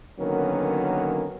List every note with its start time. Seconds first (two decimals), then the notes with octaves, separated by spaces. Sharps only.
0.20 D3 D#3 F#3 A#3 B3 C#4